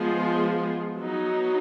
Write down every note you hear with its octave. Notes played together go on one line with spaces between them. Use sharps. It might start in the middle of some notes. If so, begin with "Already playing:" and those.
Already playing: F3 G#3 B3 F4 G#4
F#3 B3 D#4